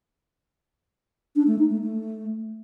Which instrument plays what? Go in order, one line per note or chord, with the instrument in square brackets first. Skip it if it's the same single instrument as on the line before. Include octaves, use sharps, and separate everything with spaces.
[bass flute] D4
A3
D#4
A3
A3